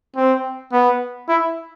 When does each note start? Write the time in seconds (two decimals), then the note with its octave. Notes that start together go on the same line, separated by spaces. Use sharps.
0.16 C4
0.72 B3
1.28 E4